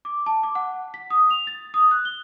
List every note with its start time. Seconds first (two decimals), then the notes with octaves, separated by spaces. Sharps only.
0.05 D6
0.26 A5
0.43 D6
0.55 F#5
0.94 B6
1.10 D#6
1.30 F7
1.47 A6
1.74 D#6
1.91 F#6
2.05 G7